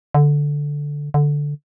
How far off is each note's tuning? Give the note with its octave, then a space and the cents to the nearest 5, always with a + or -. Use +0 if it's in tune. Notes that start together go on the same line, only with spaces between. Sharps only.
D3 -5
D3 -5